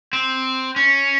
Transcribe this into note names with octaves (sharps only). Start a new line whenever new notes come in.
C4
C#4